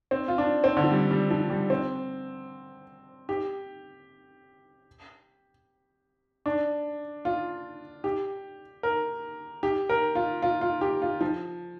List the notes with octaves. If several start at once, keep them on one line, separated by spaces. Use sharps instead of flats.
C4
F4
D4
C4
D3
F3
G3
G3
F3
G3
C4
G4
D4
F4
G4
A#4
G4
A#4
F4
F4
F4
G4
F4
F3